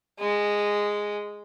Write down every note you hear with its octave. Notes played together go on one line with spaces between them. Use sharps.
G#3